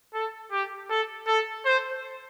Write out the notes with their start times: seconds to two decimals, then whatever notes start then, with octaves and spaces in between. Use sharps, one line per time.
0.14 A4
0.52 G4
0.90 A4
1.28 A4
1.65 C5